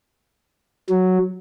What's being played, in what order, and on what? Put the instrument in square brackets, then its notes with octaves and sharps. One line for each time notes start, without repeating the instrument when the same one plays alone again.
[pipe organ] F#3